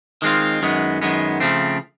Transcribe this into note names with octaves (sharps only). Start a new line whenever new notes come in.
D#3 G#3 C4 F4
F#2 D#3 G#3 B3
F#2 D#3 G#3 B3
C#3 F3 A3 C4